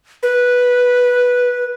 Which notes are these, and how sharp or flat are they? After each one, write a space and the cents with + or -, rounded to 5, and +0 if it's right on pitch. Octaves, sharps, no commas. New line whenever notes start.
B4 -5